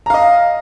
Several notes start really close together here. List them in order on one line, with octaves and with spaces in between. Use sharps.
A#5 F5 D#5